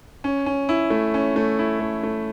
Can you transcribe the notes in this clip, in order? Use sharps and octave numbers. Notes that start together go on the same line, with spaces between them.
C#4
C#4
E4
A3
C#4
A3
E4
A3
A3